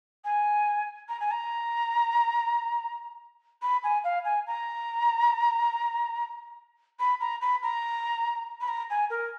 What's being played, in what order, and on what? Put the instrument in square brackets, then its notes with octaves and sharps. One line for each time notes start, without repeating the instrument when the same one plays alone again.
[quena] G#5
A#5
G#5
A#5
B5
G#5
F5
G#5
A#5
B5
A#5
B5
A#5
B5
A#5
G#5
A#4